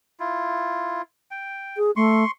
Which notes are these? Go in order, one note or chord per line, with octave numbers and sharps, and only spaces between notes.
E4 F4
G5
G#4
A3 C6 C#6